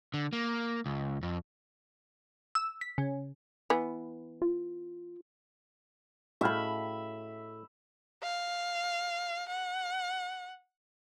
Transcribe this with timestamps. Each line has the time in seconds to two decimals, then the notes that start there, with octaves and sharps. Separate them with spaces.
0.14 D3
0.33 A#3
0.86 C#2
1.23 F2
2.55 E6
2.81 B6
2.98 C#3
3.70 E3 B3
4.42 F4
6.41 A2 E5 F5 B5
8.23 F5
9.49 F#5